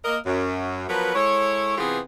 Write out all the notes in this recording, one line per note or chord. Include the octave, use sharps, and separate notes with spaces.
A#3 A#4 D#5
F#2
F3 F#3 B3 A#4 B4
G#3 E4 A4 C#5
C3 E3 B3 F4 G4 G#4